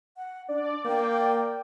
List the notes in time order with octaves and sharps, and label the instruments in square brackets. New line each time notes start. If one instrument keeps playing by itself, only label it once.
[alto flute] F#5
[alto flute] D4 [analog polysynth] D5
[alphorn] A#3 [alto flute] D5 [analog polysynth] G5